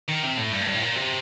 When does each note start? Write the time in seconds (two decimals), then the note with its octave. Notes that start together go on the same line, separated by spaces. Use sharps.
0.09 D#3
0.24 C3
0.38 A2
0.52 G2
0.62 A2
0.68 G2
0.75 A2
0.82 A#2
0.96 C3